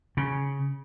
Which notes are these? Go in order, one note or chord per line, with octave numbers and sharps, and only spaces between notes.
C#3